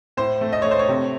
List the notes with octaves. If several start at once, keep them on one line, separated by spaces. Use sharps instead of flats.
A2 C5
A3
D#5
A3 C#5
C5
C#5
C3